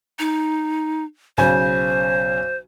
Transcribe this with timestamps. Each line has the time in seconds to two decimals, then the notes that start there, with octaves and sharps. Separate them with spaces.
0.19 D#4
1.38 B1 C#3 C5 G#5